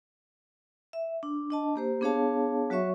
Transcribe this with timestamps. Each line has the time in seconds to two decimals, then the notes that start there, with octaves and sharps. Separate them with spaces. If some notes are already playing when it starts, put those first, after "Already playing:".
0.93 E5
1.23 D4
1.51 D4 D#5 A5
1.76 A#3 G4 C5
2.01 B3 D4 G#4 C#5 F5 A5
2.70 F#3 F#4 C#5 E5 C#6